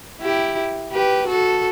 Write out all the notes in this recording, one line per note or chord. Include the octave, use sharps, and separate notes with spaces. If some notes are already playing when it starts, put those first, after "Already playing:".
E4 G4
G4 B4
F#4 A4